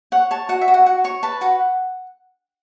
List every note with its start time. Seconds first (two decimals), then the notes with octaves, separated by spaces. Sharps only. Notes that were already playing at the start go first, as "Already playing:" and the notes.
0.12 C#5 F#5
0.31 C#5 A5
0.49 F#4 F#5
0.61 E5
0.68 F#4
0.74 F#5
0.86 F#4 F#5
1.04 C#5 C#6
1.23 B4 A5
1.41 F#4 F#5